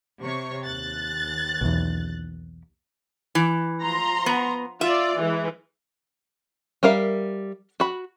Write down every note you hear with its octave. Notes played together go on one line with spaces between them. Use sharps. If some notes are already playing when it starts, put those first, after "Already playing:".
C3 C#5 C#6
D#2 F#6 A6
B1 E2
E3
F3 A#5 C6
B3
F4 D5 E5
E3 G#3
G3 A#4 E5 F5
F#4 B5